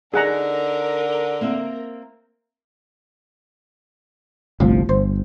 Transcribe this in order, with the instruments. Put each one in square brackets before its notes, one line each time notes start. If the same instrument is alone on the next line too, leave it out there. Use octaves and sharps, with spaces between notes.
[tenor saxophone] D3 [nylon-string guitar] D#4 [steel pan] G#4 F#5 A#5 [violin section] A#4
[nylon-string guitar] A#3 C4 E5
[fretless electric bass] G1 C2 F3 [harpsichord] A2
[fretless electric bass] G1 [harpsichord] C5